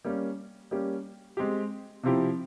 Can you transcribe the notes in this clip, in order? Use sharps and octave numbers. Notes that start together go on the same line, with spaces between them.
G3 A#3 C#4
G3 A#3 C#4 G4
G#3 C4 G4
C3 F3 C4 E4 G4